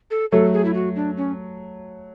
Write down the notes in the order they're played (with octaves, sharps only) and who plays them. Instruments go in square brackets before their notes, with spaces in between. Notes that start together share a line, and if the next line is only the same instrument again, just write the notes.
[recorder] A4
[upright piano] F#3 A3 [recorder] A4
[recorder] G#4
E4
F#4
D4
C#4